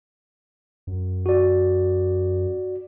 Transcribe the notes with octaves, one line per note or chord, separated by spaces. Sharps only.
F#2
F#4 D5